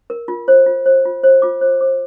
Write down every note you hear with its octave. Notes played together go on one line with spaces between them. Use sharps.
A#4
F4
C5
F4
C5
F4
C5
F4 D6
C5
C5 D6